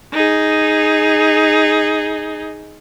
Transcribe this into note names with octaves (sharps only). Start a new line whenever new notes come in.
D#4 G#4